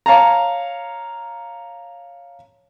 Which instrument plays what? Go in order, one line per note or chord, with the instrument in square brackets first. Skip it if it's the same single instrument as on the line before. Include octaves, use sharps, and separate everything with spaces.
[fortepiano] C#5 F5 A5 A#5